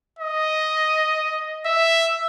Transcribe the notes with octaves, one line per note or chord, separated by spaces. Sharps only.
D#5
E5